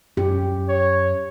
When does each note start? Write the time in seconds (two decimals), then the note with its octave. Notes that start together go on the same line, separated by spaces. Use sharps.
0.17 F#2 C#4 G4
0.69 C#5